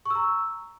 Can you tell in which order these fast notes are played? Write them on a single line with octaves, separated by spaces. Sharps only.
C#6 E6 A#5